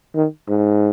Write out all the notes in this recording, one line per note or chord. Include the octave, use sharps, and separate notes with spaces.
D#3
G#2